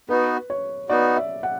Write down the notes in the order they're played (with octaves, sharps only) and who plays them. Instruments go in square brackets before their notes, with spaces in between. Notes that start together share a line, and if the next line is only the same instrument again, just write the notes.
[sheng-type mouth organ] B3 D#4 F#4 [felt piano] B4
[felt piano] C#5
[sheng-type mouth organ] B3 D#4 F#4 [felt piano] D5
[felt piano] E5
F#5